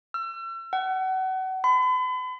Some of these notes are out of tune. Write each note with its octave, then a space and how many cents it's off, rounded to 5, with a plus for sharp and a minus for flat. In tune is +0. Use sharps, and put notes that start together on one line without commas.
E6 +40
F#5 +30
B5 +40